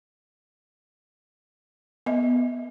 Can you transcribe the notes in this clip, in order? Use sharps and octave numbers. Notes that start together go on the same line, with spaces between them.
B3 D#5 E5